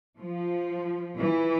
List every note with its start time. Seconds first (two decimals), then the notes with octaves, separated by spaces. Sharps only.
0.18 F3
1.17 E3